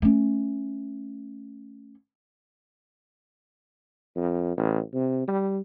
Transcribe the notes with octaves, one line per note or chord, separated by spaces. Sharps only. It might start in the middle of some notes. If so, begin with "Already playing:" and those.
A3 C#4
F2
A1
C3
G3